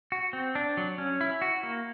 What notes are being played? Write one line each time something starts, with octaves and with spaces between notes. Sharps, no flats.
F#4
C4
D4
F#3
C#4
E4
F#4
A#3